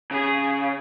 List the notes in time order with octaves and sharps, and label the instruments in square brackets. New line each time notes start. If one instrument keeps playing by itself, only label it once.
[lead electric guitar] C#3 [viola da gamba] G#4